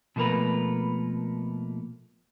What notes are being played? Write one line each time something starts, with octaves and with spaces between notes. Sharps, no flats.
B2 F3 A3 A#3 A#4 B4